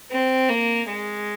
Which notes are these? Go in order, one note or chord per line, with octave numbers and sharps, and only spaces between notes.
C4
A#3
G#3